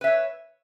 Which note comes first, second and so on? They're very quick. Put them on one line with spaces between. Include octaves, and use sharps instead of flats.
B4 E5 C#5